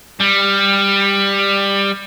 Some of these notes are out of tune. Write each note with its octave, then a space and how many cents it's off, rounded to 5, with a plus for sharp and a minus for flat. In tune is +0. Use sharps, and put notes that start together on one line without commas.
G3 +15